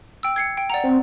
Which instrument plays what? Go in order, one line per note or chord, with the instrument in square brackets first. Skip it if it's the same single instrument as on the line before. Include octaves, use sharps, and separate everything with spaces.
[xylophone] G5 E6
G#6 C7 C#7
G5
D5 F#5 A#5
[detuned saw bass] C4